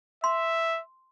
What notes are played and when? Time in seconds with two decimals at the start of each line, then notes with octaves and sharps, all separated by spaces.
0.24 E5 C6